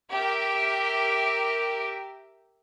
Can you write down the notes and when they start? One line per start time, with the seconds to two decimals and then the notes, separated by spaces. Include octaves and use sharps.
0.11 G4 A#4 E5